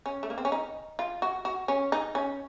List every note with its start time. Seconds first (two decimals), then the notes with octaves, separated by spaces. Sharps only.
0.06 C#4
0.23 A3
0.30 A#3
0.38 C4
0.45 C#4
0.52 D#4
0.99 F4
1.22 F#4
1.45 F#4
1.68 C#4
1.92 D#4
2.15 C#4